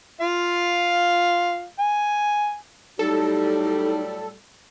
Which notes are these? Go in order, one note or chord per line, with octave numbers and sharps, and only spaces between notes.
F4 F5
G#5
A2 F#3 G3 D#4 A4